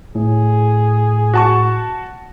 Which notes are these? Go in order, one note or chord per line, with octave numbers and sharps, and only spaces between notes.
A2 G#4
F#4 A5 C#6